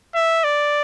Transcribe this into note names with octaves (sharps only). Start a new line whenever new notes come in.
E5
D5